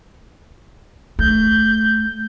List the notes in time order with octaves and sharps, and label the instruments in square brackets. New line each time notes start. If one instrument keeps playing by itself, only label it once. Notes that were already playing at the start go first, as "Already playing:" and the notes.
[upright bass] A3 [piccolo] G6